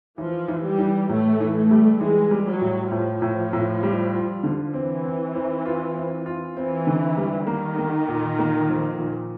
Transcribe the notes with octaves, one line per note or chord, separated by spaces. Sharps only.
E3 F3
E3
G3
E3
A2 A3
E3
A3
G3
E3 G#3
G3
F#3
A2
A2 F3
A2
A2
G3
F4
D3
E3 C4
C4
C4
F4
C4
F4
E3 C4
D3
G3
D#3 A#3
A#3
A#2
A#3
F3
A#2